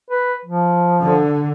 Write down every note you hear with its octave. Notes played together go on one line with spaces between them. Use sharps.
B4
F3
D3